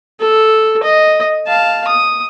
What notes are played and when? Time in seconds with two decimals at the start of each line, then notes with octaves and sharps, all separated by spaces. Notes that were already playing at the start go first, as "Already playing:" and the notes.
0.20 A4
0.83 D#5
1.47 F5 A5
1.88 D#6